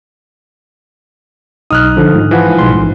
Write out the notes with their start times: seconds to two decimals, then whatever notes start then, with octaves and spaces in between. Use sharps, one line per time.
1.71 B1 D#4 D#6 F6 F#6
1.97 D3 F3
2.14 G#2
2.31 E3 F3 F#5
2.59 B1 G#2 C6
2.75 A1